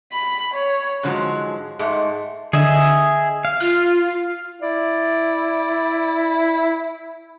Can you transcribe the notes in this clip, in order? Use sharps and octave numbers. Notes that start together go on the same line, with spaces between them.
B5
C#5
G#2 D3 F3 F#3 G#3
G#2 G#3 A3
D3 G#4 D#5 E5
F5
F4 F6
E4 D5